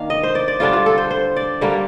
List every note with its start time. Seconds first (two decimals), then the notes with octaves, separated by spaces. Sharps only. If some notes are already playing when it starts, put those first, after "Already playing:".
Already playing: D#3 A#3 D4 F5
0.10 D#5
0.23 C5
0.35 D5
0.48 D5
0.60 D3 G3 D4 F4
0.73 F4
0.86 A4
0.98 C5
1.11 C5
1.36 D5
1.61 D3 G3 A#3